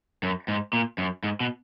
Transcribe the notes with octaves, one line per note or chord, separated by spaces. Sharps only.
F#2
G#2
A#2
F#2
G#2
B2